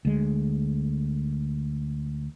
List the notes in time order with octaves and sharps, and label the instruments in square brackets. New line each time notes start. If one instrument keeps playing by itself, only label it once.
[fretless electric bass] D2 G#3